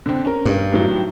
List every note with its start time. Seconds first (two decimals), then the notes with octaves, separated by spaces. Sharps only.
0.06 D3 C4
0.25 C#4 A#4
0.45 G2
0.72 A2 D#3 F#3